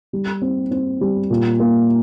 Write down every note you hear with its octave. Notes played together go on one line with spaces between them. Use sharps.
G3
C4
C4
G3
A#2
A#3